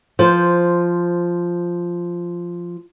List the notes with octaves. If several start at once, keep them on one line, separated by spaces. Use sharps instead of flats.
F3 C5